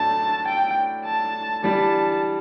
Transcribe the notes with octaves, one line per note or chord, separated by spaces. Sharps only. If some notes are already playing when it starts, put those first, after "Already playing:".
Already playing: A2 F#3 A3 D4 A5
G5
A5
E3 G3 D4 A5